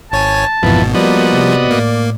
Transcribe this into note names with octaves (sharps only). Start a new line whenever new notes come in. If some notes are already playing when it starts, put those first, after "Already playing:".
G#1 C#5 G#5 A5
G#1 F2 G#2 B2 E3 B3
F3 G3 A#3 B3 F#4 D5 D#5
C3
A2 A#3